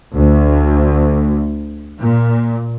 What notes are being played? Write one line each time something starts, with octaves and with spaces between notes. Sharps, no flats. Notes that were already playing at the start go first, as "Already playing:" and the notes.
D2
A#2